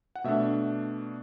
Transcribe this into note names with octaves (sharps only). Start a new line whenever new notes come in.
F#5
B2 A3 D4 E5